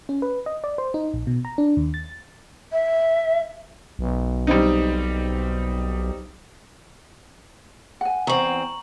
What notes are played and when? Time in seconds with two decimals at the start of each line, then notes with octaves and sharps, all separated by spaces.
0.09 C#4
0.22 B4
0.46 D#5
0.64 D5
0.78 C5
0.94 D#4
1.13 A#1
1.27 B2
1.45 A#5
1.58 D4
1.77 D#2
1.94 A6
2.72 E5
3.99 B1
4.47 G3 C4 D#4
8.01 F#5 G#5
8.27 E2 C4 A#5 C#6 F#7